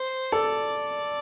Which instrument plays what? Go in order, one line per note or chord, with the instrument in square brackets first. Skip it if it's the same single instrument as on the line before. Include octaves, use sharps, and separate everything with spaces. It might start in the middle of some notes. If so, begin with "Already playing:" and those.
Already playing: [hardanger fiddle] C5
[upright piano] A4 [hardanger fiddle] D5